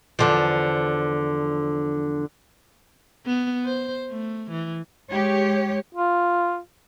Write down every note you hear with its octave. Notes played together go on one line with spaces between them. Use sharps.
E2 D3 F3
B3
C5
A3
E3
G#3 G4 C#5
F4